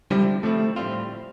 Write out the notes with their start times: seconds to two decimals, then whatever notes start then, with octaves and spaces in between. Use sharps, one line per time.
0.11 D3 F3 G3 C4 E4
0.43 D3 F3 A3 C4 E4
0.76 A2 G3 C4 F4